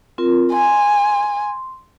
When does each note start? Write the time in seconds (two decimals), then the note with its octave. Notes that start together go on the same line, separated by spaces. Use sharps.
0.18 C4 F4 A#4
0.52 G#5 C6